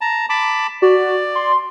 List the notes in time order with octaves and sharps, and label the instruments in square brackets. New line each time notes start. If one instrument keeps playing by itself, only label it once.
[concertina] A5 A#5
A5 B5 D6
[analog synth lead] F#4 [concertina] D5
[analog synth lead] C6